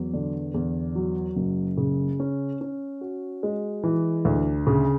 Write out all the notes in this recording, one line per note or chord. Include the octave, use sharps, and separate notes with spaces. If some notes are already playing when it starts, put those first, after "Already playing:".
Already playing: E2 F#3
D3
E2
F#3
F#1
C#3
C#4
C#4
F#4
G#3
E3
D2
C#3